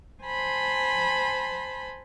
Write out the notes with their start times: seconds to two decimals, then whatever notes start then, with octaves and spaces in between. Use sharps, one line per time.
0.23 C5 G#5 A5 B5 C6